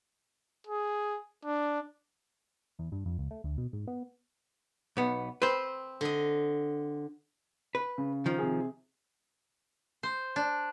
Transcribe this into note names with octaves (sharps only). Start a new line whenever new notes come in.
G#4
D4
E2
G2
F2
C#2
A3
D2
B2
G#2
B3
B1 B3
C4 B4 C5
D3 D#5
B4
C#3
D#3 F3
C3 G#4
C5
D4